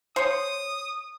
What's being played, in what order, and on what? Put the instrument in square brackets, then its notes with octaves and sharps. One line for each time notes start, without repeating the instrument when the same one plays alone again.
[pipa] C5 C#5 [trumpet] D#6